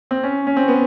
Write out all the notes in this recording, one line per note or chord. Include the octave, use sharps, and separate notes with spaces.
C4
C#4
C#4
C4
B3